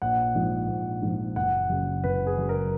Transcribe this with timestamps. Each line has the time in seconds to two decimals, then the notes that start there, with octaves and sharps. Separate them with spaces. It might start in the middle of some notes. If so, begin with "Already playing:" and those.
0.02 A#1 F#5
0.35 G#2 F3
0.68 A#1
1.02 G#2 F3
1.36 F#1 F#5
1.69 F#2 C#3
2.04 F#1 B4
2.27 G#4
2.38 F#2 C#3
2.49 A#4